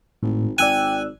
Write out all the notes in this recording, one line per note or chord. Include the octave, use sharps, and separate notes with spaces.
G#1 A2
G#1 D5 G5 G#5 E6 F#6